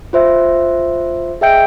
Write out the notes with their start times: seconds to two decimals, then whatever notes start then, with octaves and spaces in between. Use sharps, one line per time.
0.13 F4 C5 E5
1.41 G#4 D#5 E5 G5 G6 D7